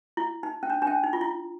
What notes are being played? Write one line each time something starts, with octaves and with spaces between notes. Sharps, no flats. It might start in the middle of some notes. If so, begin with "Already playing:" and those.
E4
D#4
C#4
D4
D4
C#4
D#4
F4
E4